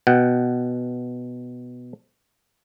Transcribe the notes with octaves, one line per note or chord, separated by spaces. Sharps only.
B2 F#5 G5